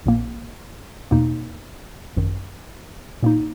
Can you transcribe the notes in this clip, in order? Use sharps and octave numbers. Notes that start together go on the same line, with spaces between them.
A#1 A#2 A#3
E2 B2 A#3 D#4
G#1 F#2 D#3
A#2 A#3 D#4